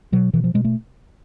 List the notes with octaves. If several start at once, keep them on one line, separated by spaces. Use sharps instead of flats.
B2 F#3
B2 E3
F3
B2 G#3
A3